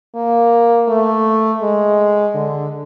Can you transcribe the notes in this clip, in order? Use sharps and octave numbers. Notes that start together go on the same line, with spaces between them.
A#3
A3
G#3
D3